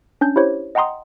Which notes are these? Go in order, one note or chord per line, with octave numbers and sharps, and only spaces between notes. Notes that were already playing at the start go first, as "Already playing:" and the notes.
C#4 D4 G6
E4 G4 C5 C#5
D#5 F#5 G5 A#5 C6 D#6